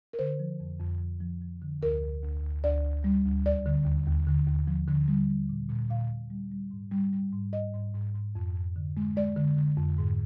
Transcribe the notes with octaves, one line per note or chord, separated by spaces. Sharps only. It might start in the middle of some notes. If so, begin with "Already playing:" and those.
A#4
D3 C5
F3
F2
F2
F3
F3
F3
D3
D2 A#4
D2
D2
D2
D2 D5
D2
G3
D2
D#2 D5
D3
D#2
D#2
D3
D#2
F3
D3
G3
G3
A#2
A#2
A#2 F5
A#2
G3
G3
G#2
G3
G3
G#2
G#2 D#5
G#2
G#2
G#2
F2
F2
D3
G#3
G#3 D5
D3
D3
F2
G#2